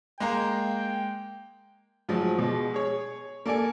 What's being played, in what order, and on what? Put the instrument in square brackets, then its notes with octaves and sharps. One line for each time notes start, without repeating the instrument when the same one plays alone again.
[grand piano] G#3 A#3 A#5 [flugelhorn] G5
[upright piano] G#2 F3 F#3 A3
B2 G#3
G#4 C#5
A#3 A4 D5 G#5 D7